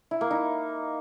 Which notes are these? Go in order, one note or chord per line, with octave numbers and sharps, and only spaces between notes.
E4
A#3
D#4